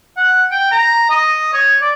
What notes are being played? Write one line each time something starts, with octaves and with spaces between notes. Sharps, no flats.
F#5
G5
A#5
D#5
C#5
D5